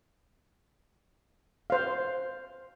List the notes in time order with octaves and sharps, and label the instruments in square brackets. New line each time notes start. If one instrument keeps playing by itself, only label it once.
[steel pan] C5 F5